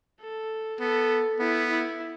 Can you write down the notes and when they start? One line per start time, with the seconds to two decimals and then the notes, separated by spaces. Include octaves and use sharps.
0.21 A4
0.80 B3 A4
1.40 B3 E4
1.70 E4